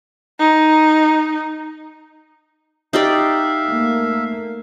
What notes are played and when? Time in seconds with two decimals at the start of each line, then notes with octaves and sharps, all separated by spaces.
0.40 D#4
2.93 D#4 G4 D5 E5 F5
3.66 A3 A#3